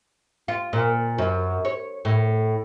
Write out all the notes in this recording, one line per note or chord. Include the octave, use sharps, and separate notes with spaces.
F4
A#2
F#2
C#5
A2